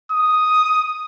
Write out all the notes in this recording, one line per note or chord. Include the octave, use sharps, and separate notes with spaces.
D#6